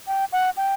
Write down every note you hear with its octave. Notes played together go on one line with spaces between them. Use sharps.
G5
F#5
G5